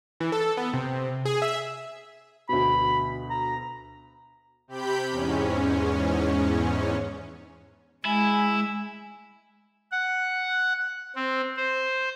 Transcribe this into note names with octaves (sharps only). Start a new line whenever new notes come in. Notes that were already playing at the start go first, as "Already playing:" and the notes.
E3
A4
B3
C3
G#4
E5
D2 B2 B5
A#5
C3 G4 B5 G6
E2 G#2 C#4
G#3 E4 G#5
F#5
C4
C5